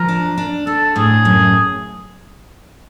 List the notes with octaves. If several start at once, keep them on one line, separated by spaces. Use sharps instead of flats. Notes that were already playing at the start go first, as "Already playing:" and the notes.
Already playing: F3 A#4
D4
D4
D4 A4
A2 G#4
F#2